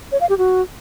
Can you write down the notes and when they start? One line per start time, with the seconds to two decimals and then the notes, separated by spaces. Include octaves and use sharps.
0.12 C#5
0.21 F5
0.29 G4
0.38 F#4